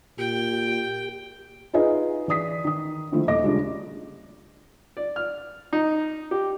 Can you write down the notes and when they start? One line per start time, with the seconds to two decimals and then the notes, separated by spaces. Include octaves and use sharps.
0.18 A#2 G4 G5
1.73 D#4 F4 G#4 B4 D#5
2.28 E3 D5 D#6 B6
2.65 D#3 D#6
3.12 D3 D#3 F3 A3 E4
3.28 D#1 A3 D#5 D6 A#6
3.44 C#3 G3 G#3 D4 F4 G#4
4.97 D5
5.16 F6
5.73 D#4
6.31 G4